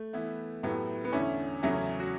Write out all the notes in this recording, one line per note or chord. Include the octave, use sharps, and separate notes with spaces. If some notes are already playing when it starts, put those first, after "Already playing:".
Already playing: A3
E3 B3 E4
A2 F#3 A3 B3 E4 G4
B3
E2 D3 A3 C#4 E4
E2 C#3 F#3 A3 C#4 E4
C#4
F#4